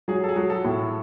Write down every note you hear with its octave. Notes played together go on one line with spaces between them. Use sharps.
F#3 G#4
A4
G#4
F#3
A4
A2